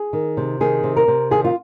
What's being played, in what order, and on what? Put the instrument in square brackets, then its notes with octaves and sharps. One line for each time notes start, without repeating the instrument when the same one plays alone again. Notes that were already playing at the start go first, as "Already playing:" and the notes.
Already playing: [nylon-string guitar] G#4
D#3
C3
D#3 G#4
C3
A#4
C3
D#3 G#4
F4